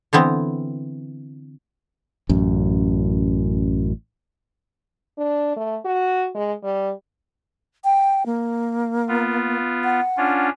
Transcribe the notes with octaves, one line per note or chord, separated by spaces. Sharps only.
D3 E3 B3 C4
A1 F#2
D4
A3
F#4
G#3
G3
G5
A#3
B3 F4
F#5
C#4 D4 F4